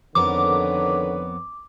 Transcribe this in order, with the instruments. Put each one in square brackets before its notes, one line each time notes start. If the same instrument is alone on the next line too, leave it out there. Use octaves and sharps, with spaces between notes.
[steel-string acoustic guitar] F2 B3 A#4 [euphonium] D3 [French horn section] D#3 B4 C#5 [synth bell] D6